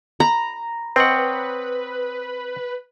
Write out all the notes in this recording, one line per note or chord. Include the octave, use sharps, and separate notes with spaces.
A#5 B5
C4 B4 C#5 D#5 F#5 G5